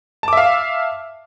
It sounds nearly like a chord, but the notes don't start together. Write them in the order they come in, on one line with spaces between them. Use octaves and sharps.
A5 D6 E5 F5